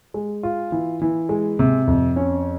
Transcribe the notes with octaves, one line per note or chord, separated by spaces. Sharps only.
G#3
F4
E3
E3
G#3
C3
F2
C#4